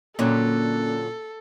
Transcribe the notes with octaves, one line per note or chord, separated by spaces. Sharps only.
A#2 D3 F#3 A#3 C#4 A4 F#6